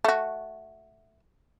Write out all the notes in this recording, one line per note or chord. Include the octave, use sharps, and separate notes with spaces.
A3 F#4